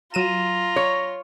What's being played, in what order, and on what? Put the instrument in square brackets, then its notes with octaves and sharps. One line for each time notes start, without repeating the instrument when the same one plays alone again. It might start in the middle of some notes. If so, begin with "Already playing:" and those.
[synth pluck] F#3 D#7 E7 [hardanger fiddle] F4 [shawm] A#5
[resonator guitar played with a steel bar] C#5